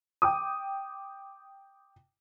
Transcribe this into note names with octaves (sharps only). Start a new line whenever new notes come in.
G5 D6 D#6